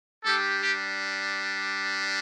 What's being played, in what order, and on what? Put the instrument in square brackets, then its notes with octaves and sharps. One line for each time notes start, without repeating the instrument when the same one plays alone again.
[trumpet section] G3 D4 G4 A4
G4